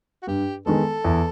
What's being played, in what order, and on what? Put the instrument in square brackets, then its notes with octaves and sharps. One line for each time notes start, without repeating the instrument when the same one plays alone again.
[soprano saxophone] F#4
[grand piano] G2 [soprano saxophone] G4
[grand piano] D#3 G#3 B3 [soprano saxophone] A4
[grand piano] E2